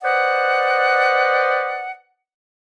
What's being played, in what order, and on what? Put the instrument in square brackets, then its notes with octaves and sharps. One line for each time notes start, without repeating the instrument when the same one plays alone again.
[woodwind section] B4 C5 D5 D#5 F#5